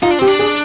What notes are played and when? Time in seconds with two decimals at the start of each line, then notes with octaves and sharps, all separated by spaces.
0.03 D#4 F4
0.11 D4
0.19 C4 G4
0.27 D4
0.39 G#4